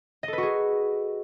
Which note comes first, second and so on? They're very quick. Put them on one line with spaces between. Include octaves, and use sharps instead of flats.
D#5 A4 B4 F#4 G#4